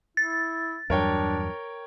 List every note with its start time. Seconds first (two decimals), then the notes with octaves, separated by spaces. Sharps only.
0.17 E4 A6
0.90 E2 G2 F#3 D4 A#4 C#5 G5